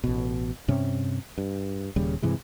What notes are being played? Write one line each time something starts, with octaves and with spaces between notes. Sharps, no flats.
A1 B2
G2 C3 C#4
G2
D#1 D#2 C#3 G3
G2 C3 E3 G#3